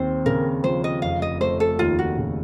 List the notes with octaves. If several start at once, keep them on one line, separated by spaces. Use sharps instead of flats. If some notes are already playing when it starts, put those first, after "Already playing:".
Already playing: D#2 C4 C5
C#3 A#4
F3 C5
D#5
F1 F5
D#5
A3 C5
A4
D#2 F4
F#4
C#3